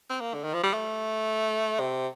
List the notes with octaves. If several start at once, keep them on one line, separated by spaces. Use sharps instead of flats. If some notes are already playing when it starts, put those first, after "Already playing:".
C4
A#3
D3
D#3
F3
G3
A3
C3